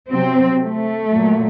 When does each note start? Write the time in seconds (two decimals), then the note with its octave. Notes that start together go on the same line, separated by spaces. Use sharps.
0.11 C3 F#3 C4
0.60 A3
1.10 A#2 F#3